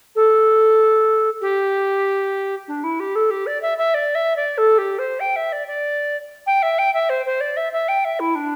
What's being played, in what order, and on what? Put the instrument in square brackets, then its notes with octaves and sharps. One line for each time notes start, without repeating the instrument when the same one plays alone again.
[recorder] A4
G4
D4
E4
G4
A4
G4
D5
E5
E5
D5
E5
D5
A4
G4
C5
G5
E5
D5
D5
G5
E5
G5
E5
C5
C5
D5
E5
E5
G5
E5
E4
D4